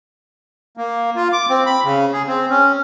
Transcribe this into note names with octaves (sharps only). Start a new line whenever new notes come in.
A#3
F4
D6
C4
B5
C#3
G#4
C4
C#4